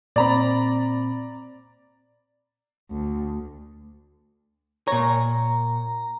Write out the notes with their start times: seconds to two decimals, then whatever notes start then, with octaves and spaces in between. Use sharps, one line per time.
0.16 A#2 C4 D5 A#5 B5
2.91 D2
4.88 A#2 C#5 A#5